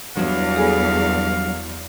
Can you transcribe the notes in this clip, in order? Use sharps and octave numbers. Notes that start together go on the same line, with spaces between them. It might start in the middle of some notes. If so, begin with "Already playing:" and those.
E2 G2 F#3 F5
G#4 A4 G#5